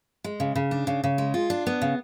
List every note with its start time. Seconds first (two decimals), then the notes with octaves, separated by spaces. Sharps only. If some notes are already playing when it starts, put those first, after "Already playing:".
0.24 G#3
0.40 C#3
0.55 C#3
0.71 D4
0.87 C#3
1.04 C#3
1.18 G#3
1.34 F4
1.50 D4
1.67 B3
1.82 C#3